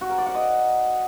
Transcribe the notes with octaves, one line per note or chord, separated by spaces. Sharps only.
F#4
A#4
D5
F#5
D#5